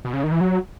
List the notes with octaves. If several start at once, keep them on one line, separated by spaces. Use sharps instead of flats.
B2
C#3
D#3
E3
F#3